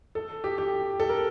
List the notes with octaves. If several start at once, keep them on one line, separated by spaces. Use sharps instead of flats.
A4
G4
G4
A4
A#4